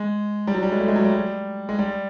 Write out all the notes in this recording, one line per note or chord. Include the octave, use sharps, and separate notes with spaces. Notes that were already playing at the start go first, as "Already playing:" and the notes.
Already playing: G#3
G3
F#3
G3
G#3
A3
G#3
F#3
G3
G#3
G3